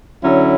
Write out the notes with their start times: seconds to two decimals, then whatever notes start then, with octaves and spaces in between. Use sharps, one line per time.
0.23 D3 F#3 C#4 E4